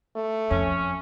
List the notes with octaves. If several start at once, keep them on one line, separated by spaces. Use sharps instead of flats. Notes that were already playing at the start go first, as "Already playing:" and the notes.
A3
F2 C#4